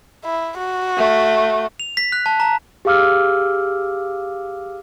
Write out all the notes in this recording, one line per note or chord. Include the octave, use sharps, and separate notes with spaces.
E4
F#4
A3
F7
B6
F#6
A5
A#5
G4 G#4 F5 D6 E6 F6